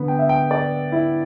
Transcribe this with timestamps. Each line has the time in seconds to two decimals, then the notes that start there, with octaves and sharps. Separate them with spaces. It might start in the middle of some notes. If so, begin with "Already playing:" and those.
Already playing: D3 B3 B4
0.08 G5
0.19 E5
0.29 G5
0.51 D5
0.92 E4